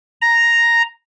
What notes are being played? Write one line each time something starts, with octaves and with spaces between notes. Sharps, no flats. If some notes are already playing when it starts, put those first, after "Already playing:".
A#5